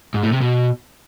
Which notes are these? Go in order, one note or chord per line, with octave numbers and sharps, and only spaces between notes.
G#2
A2
C3
B2